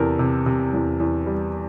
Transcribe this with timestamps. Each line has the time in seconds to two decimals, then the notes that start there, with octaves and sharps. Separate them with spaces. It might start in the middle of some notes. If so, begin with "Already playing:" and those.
Already playing: E2 C3 A4 A#4
0.19 C3
0.46 C3
0.73 E2
1.00 E2
1.26 G3